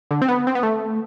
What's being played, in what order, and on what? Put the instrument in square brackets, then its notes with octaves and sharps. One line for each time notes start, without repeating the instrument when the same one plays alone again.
[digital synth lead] D3
C4
B3
C4
B3
A3